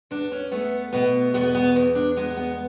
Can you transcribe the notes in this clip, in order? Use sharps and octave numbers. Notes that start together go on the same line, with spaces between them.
E2 D4
C#4
A3 B3
B2 B3
E2 B3
B3
E2
D4
G#3 B3
B3